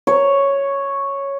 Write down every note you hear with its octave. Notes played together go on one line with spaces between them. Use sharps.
C#5